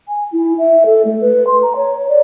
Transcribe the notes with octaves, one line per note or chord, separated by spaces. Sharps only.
G#5
E4
E5
A4
A3
B4
C6
A#5
C#5
D5